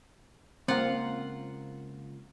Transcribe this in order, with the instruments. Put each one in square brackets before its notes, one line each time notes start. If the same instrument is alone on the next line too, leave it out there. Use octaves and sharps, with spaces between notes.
[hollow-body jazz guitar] C#2 A#3 [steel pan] C4 [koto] F4 F#5